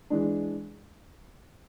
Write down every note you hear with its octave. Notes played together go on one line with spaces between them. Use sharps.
E3 G#3 D4